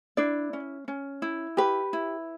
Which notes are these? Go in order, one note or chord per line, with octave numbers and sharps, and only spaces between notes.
D4 E4 D5
C#4
C#4
E4
G4 B4
E4